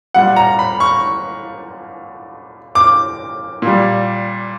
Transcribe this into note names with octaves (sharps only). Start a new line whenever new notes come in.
A#2 G3 F#5
A#5
B5
C#6
D6
A#2 G3